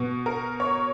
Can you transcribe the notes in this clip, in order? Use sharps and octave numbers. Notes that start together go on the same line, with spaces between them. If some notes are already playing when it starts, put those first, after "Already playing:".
Already playing: B2
A#4
C#5